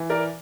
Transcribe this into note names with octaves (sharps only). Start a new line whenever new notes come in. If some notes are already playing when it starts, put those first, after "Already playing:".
Already playing: E3
A#4 D5